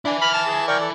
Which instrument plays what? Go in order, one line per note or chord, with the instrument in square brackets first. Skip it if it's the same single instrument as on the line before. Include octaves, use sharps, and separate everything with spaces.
[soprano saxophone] D4 [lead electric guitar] E4 G#5
[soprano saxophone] B5 [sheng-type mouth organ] F6
[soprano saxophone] A5
[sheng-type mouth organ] G#4
[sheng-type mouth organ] A#4 G5 C#6 [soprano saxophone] D5
[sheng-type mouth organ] A4